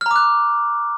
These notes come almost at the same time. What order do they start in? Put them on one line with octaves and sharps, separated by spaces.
F6 A#5 D6 F#6